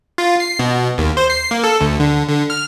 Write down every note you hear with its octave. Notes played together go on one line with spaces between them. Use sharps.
F4
C7
B2
D#2
C5
C7
A#3
A4
D2
D3
D3
F6